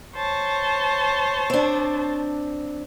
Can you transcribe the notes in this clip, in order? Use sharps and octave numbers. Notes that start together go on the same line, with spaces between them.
C5 C#5 A5
C4 D4